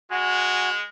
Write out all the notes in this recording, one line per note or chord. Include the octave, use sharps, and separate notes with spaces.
G#3 F#4 G#5 F#6